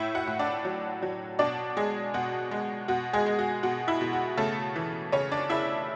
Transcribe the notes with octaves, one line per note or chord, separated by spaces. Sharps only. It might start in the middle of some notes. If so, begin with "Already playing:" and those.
Already playing: A2 E4 E5
F#4 F#5
A2
D4 D5
F#3
F#3
B2 D4 D5
G#3 G#4
B2 F#4
G#3
B2 F#4
G#3 G#4
G#3
F#4
B2 F#4
E4
B2
F#4
C#3 A3 A4
E3
C#3 C#4 C#5
D4 D5
C#3 E4 E5